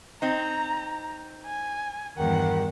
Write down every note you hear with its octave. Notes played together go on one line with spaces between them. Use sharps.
C4 D#4 A#5
G#5
E2 G2 D#3 F#5